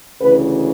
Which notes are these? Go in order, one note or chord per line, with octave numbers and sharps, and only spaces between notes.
D2 C#3 E3 B4